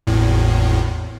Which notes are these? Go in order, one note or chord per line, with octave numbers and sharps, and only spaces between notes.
G#1 E2 A2